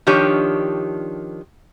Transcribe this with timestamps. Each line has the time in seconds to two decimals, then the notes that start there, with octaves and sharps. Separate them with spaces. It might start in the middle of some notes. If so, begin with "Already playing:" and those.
0.07 D#3 F3 D4 G4 C#5